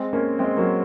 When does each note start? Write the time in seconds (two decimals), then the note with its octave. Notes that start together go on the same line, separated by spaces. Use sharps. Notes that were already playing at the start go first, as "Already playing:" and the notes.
Already playing: G#3 C4
0.13 A#3 C#4
0.39 G#3 C4
0.57 F#3 A#3